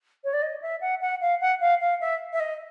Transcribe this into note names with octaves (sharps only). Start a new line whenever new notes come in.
C#5
D5
D#5
E5
F#5
F#5
F5
F#5
F5
F5
E5
E5
D#5